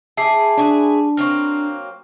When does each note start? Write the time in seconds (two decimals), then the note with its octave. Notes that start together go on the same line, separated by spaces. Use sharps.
0.17 E4 G#4 E5 A5 D6 C7
0.58 D4 E4 F#4 G#4
1.17 F#3 A#3 C4 C#6 F6